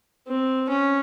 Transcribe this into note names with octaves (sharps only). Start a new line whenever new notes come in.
C4
C#4